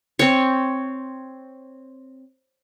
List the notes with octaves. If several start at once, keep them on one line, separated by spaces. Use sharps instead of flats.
C4 C#5